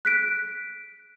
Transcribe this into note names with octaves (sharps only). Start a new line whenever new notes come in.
F#6 B6 D7